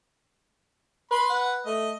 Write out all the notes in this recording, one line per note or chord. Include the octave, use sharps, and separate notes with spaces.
B4 B5 C6
F#5
A3 D#5